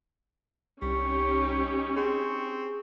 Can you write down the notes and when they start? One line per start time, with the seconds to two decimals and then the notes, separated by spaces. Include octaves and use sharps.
0.82 C2 G3 C#4 D#4 G4 C#6
1.96 C4 G#4 C#6